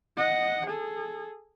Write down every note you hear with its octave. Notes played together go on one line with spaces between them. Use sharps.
D#5 F#5
G#4 A4